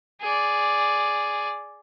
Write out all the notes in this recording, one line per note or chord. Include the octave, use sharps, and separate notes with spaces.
G#4 D5